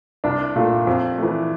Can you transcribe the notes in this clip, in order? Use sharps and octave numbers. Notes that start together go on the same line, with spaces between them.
C2 D4
A#2 A3
F2
E3 A3